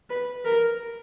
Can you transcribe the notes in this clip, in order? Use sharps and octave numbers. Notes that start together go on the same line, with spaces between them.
B4
A#4